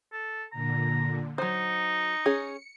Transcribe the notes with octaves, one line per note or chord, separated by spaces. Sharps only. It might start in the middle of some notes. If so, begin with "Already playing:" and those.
A4
A#2 D3 A#5
F#3 D#4 C5 C#7
C#4 G#4